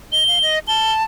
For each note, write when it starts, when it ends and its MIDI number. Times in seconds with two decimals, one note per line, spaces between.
0.12 0.24 75
0.12 0.54 103
0.27 0.38 77
0.42 0.59 75
0.68 1.03 81
0.68 0.92 103